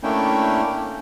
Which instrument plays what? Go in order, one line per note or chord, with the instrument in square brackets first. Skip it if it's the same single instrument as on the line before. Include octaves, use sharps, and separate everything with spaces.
[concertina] A3 A#3 C#4 D4 E4 G5